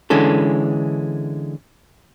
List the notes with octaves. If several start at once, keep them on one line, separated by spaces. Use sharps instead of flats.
D3 E3 G#3 C#4 A4